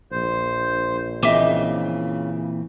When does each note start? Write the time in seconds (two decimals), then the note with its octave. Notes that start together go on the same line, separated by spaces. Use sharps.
0.11 A#1 C5
1.23 A#2 C#3 E3 C4 D#5 E5 D6